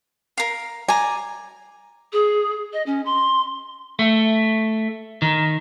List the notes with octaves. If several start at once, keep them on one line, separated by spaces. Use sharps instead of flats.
A#4 F5
D5 G#5 A#5
G#4
D#5
C#4
C6
A3
D#3